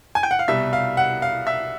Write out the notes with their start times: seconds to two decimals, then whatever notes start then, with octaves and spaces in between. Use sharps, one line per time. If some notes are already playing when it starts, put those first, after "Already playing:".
0.15 G#5
0.23 G5
0.31 F#5
0.39 F5
0.48 C2 B2 G3 E5
0.73 F5
0.97 F#5
1.22 F5
1.47 E5